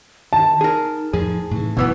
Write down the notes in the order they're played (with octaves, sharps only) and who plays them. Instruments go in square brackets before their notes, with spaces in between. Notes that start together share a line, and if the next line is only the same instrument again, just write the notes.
[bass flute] D#3 [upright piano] A5
[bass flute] D#4 [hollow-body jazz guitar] G#4 A#4
[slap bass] F2 A2 F3 [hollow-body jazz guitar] G#4
[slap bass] A2 C3 E3
[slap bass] F#1 F#2 [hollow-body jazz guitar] B2 E3 B3